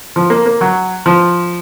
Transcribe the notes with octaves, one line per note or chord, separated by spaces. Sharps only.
F3
A#3
A#3
F#3
F3